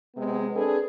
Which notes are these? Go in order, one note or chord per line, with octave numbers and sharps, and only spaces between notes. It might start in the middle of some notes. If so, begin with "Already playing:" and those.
C3 F#3 G#3 B3
C4 D4 G#4 A4 B4